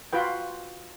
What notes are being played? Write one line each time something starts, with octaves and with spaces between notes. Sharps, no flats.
F4 F#4 B4 G5